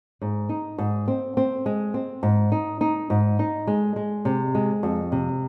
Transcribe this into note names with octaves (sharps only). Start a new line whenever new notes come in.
G#2
D#4
G#2
C4
C4
G#3
C4
G#2
D#4
D#4
G#2
D#4
G#3
G#3
C3
G#3
F2
C3